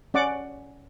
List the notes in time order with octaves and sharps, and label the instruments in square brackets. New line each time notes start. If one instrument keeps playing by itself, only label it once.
[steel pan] C#4 D5 F#5 D6